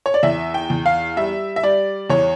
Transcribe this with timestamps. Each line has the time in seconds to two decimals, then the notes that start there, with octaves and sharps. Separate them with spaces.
0.06 C#5
0.14 D5
0.23 E2 E5
0.54 G5
0.70 E2
0.86 F5
1.17 G3 E5
1.56 E5
1.63 G3 D5
2.10 E2 C#5